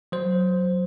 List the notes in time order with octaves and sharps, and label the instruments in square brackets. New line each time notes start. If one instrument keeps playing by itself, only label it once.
[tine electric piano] F#3 C5